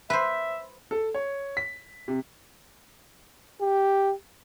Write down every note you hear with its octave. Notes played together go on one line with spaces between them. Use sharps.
B4 C5 E5
A4
C#5
B6
C3
G4